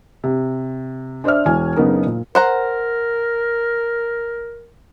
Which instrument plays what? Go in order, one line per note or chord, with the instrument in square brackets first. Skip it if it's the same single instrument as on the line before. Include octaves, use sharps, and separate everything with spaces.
[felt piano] C3
D4 C5 D5 E5 F6
E1 G#5
F#1 C#3 B3 D#4 A#4
A#2
[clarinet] A#4 [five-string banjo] C5 F#5 A#5